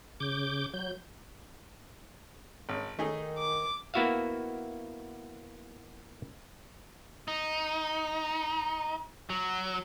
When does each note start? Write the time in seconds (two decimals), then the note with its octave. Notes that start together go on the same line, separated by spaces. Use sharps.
0.20 C#3 D6 G6
0.74 F#3 G6
2.69 G#1
2.99 D#3 A3 D#4 G#4
3.37 D6
3.94 A#3 B3 E4 F#4 E5 F5
7.28 D#4
9.30 F#3